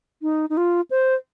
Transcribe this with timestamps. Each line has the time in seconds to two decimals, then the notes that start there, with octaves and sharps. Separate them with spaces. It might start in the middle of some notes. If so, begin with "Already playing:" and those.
0.22 D#4
0.50 D#4
0.57 F4
0.91 C5